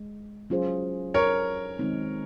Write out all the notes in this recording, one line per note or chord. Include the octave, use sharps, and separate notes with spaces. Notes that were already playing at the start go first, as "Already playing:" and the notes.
Already playing: G#3
F#3 C#4 F4 G#4 C5
A#4 C#5
D#3 G#3 C4 D#4